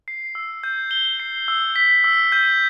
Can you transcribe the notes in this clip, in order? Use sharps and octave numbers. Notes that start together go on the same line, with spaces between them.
C7
E6
G6
G7
C7
E6
B6
E6
G6